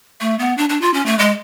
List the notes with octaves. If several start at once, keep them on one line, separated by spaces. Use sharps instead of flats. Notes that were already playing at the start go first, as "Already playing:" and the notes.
A3
B3
D4
D4
F4
C#4
A3
G#3